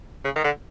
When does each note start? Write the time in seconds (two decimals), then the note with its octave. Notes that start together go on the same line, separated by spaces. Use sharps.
0.24 C#3
0.36 D#3
0.44 D3